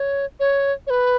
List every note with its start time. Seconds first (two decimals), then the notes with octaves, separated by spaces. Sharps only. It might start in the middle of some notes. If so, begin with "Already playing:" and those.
Already playing: C#5
0.40 C#5
0.87 C#5
0.90 B4